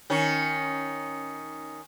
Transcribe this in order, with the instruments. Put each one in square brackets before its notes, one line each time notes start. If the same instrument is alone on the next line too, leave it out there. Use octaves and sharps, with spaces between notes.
[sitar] D#3 C#4